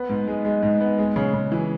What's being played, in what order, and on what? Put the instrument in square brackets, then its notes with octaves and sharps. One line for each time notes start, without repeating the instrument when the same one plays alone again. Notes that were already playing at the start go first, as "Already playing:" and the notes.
Already playing: [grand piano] B3
G#2
G#3
G#3
G#2
B3
G#3
C#3
C#3
E3